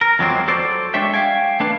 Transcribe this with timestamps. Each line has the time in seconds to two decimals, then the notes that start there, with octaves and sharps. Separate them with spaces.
0.01 A#4
0.19 F2 F3 F#3 G#3 A#3 C4
0.48 F#4 A4 C5 D5
0.94 G#3 D4 C#5 E5 G5
1.14 F5 G5 G#5
1.60 A3 D4 B4 F5